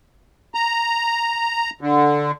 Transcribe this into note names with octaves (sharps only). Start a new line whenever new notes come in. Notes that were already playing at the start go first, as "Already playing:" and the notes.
A#5
D3